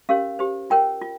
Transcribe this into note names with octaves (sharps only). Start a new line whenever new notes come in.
C#4 G4 A#4 C#5 F5
G4 C5
F4 A#4 C#5 G5
F4